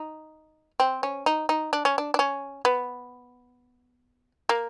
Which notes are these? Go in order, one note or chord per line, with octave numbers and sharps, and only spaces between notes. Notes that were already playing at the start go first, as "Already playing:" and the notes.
Already playing: D#4
C4
C#4
D#4
D#4
D4
C#4
D4
D4
C#4
B3
A#3